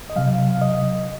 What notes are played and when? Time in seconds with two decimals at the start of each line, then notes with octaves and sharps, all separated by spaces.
0.10 D#5
0.16 C3 F#3 F5
0.50 F5
0.61 D#5